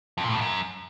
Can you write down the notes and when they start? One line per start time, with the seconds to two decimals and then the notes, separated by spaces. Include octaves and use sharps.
0.18 F2
0.24 A#2
0.29 A2
0.35 F2
0.41 F#2